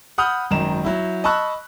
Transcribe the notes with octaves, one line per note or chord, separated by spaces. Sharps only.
F#5 B5 D#6 F6 G6
G#1 F#2 D#3 A#5 E7
F#3 E4
D#5 A5 B5 C#6 E6 F#6